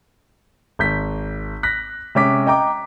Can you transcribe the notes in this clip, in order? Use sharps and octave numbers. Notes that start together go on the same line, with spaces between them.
G#1 G6 B6
F#6 A#6 B6
C3 G#3 C#4 D6 B6
D#5 G5 A#5 D6